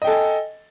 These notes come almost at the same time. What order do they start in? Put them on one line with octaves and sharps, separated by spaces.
D#5 G5 A4 G#5